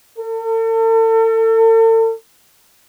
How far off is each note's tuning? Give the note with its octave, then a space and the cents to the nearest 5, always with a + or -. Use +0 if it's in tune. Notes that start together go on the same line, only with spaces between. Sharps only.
A4 +40